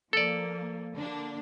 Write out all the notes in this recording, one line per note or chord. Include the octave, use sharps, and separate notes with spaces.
F3 A#3 A4 D5
D3 A#3 D4